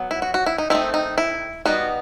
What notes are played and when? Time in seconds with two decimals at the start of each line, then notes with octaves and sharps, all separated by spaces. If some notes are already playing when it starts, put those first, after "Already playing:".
Already playing: F#3 B3
0.11 E4
0.22 F#4
0.34 F#4
0.46 E4
0.58 D#4
0.70 D#3 A3 C4 D#4 E4
0.94 D#4
1.18 E4
1.65 G3 B3 D#4 F#4